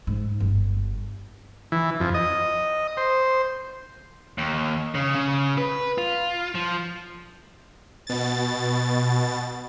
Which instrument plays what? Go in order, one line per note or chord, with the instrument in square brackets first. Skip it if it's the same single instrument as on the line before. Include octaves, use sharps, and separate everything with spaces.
[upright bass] G#2
G1
[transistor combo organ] E3
F2
D#5
C5
[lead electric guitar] D#2
C#3
C#3
B4
F4
F3
[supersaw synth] B2 A6